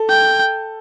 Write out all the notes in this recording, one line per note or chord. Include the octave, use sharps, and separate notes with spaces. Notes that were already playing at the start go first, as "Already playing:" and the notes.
Already playing: A4
G5